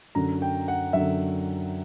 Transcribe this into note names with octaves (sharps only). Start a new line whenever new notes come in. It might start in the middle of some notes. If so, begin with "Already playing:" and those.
F#2 D3 F#3 A#5
G5
F#5
F#2 D3 F#3 E5